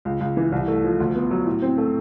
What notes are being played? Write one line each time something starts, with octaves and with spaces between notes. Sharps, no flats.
C#2
C#2
E3
C2
A3
F3
D2
B3
F#3
A2
C4
A3